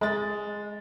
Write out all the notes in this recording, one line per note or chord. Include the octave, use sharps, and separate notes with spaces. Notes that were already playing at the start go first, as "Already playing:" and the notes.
G#3 A6